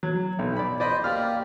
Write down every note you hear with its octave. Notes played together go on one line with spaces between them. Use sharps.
F#3
B1
D5 B5
C5 D5 D#5 B5
A#3 G4 D5 F6